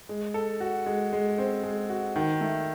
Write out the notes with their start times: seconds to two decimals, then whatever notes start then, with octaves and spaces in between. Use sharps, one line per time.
0.09 G#3
0.34 A4
0.60 F#4
0.86 G#3
1.13 G#3
1.38 C4
1.63 G#3
1.90 F#4
2.16 D#3
2.41 A3